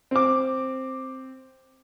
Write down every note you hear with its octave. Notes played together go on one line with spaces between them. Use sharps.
C4 D6